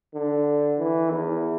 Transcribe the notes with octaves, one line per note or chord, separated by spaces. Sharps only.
D3
E3
E2